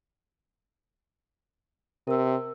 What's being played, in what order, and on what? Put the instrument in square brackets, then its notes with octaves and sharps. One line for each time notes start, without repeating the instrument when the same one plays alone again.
[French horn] C3 [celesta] A#4 E6